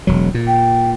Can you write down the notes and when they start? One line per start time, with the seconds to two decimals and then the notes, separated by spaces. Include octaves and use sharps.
0.07 E1 F#3
0.34 A#2
0.47 G5